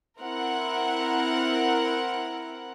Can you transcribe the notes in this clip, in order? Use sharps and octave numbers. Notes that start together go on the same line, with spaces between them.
C4 E4 A#4 F#5